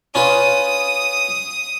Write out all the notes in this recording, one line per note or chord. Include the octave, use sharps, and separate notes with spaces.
C#4 F4 B4 D#6